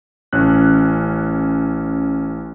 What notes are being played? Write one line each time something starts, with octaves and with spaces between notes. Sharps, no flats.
A1 C#4 F#6